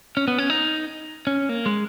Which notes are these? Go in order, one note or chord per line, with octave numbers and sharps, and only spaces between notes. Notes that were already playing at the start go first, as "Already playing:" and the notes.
C#4
B3
C#4
D#4
C#4
A#3
G#3